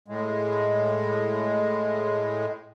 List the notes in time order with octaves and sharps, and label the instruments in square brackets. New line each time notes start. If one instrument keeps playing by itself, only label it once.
[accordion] A2 G#3